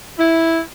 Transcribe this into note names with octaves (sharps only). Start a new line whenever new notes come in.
E4